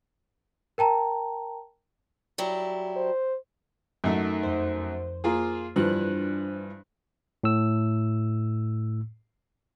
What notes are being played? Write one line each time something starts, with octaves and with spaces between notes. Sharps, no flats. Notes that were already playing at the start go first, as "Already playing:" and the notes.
A#4 G5 A5 A#5
F#3 G3 E4
C5
F#2 A3 D#4 A#4 E5
F2 C5
A#3 F4 G#4
G2 E3 F3 D4 C5 F#6
A2 E6